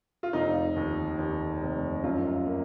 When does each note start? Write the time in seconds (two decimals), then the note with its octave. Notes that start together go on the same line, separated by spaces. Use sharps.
0.23 F4
0.33 F1 D#4
0.76 D#2
1.18 D#2
1.61 F1
2.03 F#2 F4
2.46 A#3